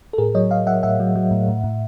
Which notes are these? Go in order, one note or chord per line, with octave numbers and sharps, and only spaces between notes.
A4
A2 G#4 A#4
F#3 C#5 D#5
F#3 D#5 F5
F#3 E5 F#5
A2 E5 F#5
F#3
F#3
A2
A2
A2